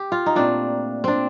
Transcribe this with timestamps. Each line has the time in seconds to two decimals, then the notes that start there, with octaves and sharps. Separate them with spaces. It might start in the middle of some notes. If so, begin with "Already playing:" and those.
Already playing: G4
0.12 F4
0.26 D#4
0.36 A#2 A3 C4 D4
1.04 C4 D4